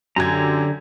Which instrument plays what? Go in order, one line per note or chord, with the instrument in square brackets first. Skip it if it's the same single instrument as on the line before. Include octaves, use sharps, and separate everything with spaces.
[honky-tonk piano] F#2 G#6 [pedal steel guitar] D3 G4 A#5